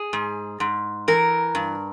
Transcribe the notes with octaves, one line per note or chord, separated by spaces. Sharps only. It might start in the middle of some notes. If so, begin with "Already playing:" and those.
Already playing: G#4
G#2
G#2
E3 A#4
G2